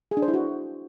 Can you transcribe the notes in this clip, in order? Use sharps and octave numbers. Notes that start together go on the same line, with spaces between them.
G#4
D4
C5
E4
F#4